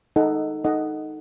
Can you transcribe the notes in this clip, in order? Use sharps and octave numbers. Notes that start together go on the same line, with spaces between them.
D#4 A4 D#5 F#5
D#4 A4 D#5 F#5